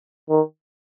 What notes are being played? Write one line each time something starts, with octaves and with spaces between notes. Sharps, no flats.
D#3